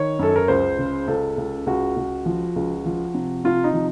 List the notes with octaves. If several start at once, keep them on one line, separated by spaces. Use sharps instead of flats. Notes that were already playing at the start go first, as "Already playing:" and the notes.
Already playing: D#3 C#5
F#2 A4
A#4
C#2 C5
C#3
C#2 A4
C#2
C#2 F#4
C#2
F3
C#2
F3
C3
C3 F4
D#4
F3